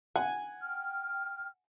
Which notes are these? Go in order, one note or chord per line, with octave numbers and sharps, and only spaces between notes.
F#5 G#5
G5 F6